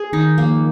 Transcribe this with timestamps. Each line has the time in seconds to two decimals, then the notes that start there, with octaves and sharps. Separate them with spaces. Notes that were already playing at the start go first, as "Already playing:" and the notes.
Already playing: G#4
0.13 D#3 D#4
0.38 F3 A#3